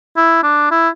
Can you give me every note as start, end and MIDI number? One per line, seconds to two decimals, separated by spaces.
0.17 0.39 64
0.43 0.70 62
0.71 0.89 64